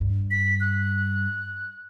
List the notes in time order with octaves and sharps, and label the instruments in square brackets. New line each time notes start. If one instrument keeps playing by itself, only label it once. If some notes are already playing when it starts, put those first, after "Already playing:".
[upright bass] G2
[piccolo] B6
F#6